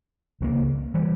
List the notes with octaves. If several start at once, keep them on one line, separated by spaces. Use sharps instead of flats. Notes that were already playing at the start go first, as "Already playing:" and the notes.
C#2 C#3 E3 A#3
E3 G3